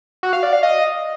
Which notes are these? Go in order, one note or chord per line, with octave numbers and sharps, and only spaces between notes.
F#4
F5
D5
F5
D#5